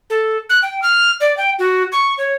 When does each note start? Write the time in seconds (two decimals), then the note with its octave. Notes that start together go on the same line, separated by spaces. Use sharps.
0.10 A4
0.49 F#6
0.63 G5
0.82 F6
1.21 D5
1.37 G5
1.59 F#4
1.92 C#6
2.18 C#5